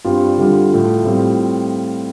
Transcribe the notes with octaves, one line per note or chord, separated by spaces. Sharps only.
G2 G3 C4 F4
D3 G3 F4
A2 A3 F4
A2 G3 C4 F4